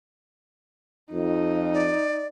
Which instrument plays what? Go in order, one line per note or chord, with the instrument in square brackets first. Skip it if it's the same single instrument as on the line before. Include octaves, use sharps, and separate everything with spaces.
[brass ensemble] F2 [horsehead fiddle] D#4
[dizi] D5